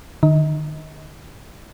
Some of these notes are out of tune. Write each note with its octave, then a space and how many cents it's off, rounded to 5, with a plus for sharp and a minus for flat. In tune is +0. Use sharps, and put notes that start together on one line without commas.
D#3 -45 D#5 +30